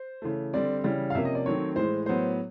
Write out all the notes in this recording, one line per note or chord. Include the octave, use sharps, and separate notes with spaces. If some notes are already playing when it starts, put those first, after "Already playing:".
Already playing: C5
C#3 E3 A3
D3 G3 C4 D5
C#3 E3 G3
F5
C3 F3 A#3 C#4 E5
D#5
D5
D#3 F#3 A3 C4 C#5
A2 E3 G#3 C5
A2 F#3 B3 C5